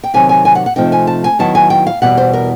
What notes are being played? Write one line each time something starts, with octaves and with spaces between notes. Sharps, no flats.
G5
C3 D#3 F#3 G#5
G#5
G#5
F#5
F#5
C3 F3 A3 C4 D#4 G5
G#5
A5
G#5
D#3 F#3 B3 E4 A5
G#5
G5
F5
E2 B2 G3 B3 F#5
C5
A#4